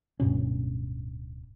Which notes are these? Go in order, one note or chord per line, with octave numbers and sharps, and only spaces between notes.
D1 G2 B2 C#4